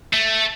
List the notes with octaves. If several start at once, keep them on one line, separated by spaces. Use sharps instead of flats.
A3